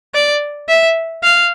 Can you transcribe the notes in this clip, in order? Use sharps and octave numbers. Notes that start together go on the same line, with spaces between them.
D5
E5
F5